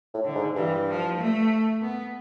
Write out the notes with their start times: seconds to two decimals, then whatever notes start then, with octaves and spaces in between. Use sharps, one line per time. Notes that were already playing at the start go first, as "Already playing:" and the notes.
0.14 A2
0.25 D3
0.35 G#2
0.56 G2 E3
0.87 F3
1.19 A3
1.81 B3